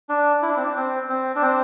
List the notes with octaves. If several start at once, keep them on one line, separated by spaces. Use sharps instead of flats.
D4
E4
D4
C4
D4
C4
C4
D4
C4